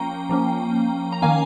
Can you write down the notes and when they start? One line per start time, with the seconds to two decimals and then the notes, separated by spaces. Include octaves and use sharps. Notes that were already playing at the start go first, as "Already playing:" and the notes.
Already playing: F3 A#3 C#4 G5 A#5
0.29 F3 A#3 C#4
1.12 A#5
1.22 D#3 A#3 C#4 F5 G#5